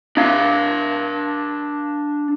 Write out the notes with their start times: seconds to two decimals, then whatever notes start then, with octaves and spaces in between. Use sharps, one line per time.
0.17 D4 F5